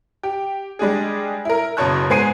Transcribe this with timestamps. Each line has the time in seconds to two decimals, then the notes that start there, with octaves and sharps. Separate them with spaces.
0.23 G4
0.79 G3 G#3 D4 G#4
1.45 E4 A#4
1.77 F#1 F#2 B2 C#5 A5 F#6
2.10 G#2 B3 C5 G#5 C7